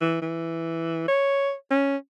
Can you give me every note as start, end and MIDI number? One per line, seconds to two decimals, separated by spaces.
0.01 0.18 52
0.22 1.04 52
1.08 1.53 73
1.71 1.96 61